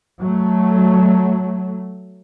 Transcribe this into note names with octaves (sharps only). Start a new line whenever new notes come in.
F#3 A3